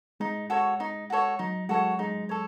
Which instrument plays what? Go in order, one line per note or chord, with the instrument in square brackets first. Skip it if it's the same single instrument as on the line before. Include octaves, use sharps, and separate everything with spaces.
[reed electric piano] G#3 [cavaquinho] D#4
[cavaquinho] F#4 A4 C#5
D#4
F#4 A4 C#5
[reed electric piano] F#3 [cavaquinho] D#4
[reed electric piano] G#3 [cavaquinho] F#4 A4 C#5
[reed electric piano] G#3 [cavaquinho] D#4
[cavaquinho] A4 C#5